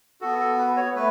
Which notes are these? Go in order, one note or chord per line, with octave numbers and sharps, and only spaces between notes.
B3 F#4 A4
A4
B4
C#5
A3 B4